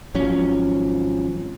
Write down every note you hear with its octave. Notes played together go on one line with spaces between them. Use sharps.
G#1 F3 F#3 C#4